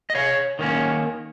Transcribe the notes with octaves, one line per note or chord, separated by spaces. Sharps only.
D#5
C#5 F5
D#3 A#3 C#4